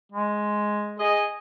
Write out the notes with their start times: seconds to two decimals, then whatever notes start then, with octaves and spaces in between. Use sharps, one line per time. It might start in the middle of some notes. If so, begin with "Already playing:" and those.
0.12 G#3
1.00 G#4 D#5